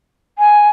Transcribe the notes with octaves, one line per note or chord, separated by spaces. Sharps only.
G#5